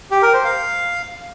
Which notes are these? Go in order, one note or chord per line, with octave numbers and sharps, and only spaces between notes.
G4
A#4
C5
F5